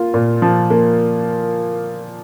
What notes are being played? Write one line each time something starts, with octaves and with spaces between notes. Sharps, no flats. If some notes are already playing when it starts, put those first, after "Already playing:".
Already playing: A#3 F4
A#2
F3
A#3